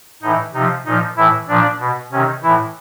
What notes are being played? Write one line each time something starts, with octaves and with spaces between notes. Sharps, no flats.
A2 E3 D#4
C3 F3 D#4
A#2 F3 D#4
A2 E3 E4
A#2 F3 D4
B2
C3 D#3 C#4
A2 E3 E4